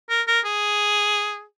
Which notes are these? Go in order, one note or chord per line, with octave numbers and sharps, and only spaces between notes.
A#4
A#4
G#4